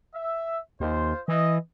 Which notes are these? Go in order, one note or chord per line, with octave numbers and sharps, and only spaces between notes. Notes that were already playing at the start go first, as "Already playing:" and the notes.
E5
D#2 F4 C5
E3 D#5